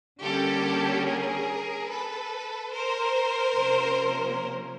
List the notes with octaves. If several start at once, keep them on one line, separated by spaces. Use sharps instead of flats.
D3 G3 A#3 C#4 G4 A4
G#4 A#4
A4 B4
A#4 C5
C3 F3 A#3 C#4